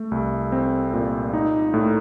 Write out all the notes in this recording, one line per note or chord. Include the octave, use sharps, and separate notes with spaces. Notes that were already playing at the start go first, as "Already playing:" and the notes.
Already playing: A3
C2
C4
A#2
D#4
A2